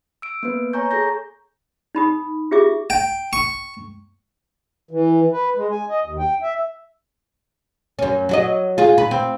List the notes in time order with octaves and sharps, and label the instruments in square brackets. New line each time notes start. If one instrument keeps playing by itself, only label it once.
[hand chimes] E6 D7
A#3 B3 B4
C#5 G#5 A#5 C#6 G6
G#4 A4 A#5 G6 A#6
[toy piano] D#4 B5 D#6
F4 G4 G#4 E5 D6
[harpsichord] G5
C#6
[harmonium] E3
B4
G#3
G#5
D#5
D#2
G5
E5
[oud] F#2 C#4
F#3 F#4 D#5
F4 G#4
B4
C4